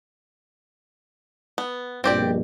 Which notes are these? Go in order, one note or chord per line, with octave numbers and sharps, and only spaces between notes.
B3
A#1 G2 B2 C4 G4 D5